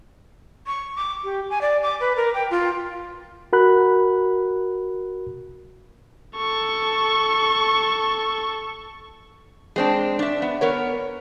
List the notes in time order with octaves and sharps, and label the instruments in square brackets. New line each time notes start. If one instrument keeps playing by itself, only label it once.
[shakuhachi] C#6
D6
G4
G#5
D5
D6
B4
A#4
G5
F4
[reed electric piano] F#4 A#4 B5 F#6
[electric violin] A4 C#6
[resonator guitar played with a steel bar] G#3 C4 D4
D4 E5
B3
B3 A#4 C#5